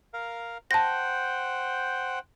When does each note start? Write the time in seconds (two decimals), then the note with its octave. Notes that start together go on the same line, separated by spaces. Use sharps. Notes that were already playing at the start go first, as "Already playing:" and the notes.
0.14 A#4 F5
0.71 C5 F#5 G5 A5 A#6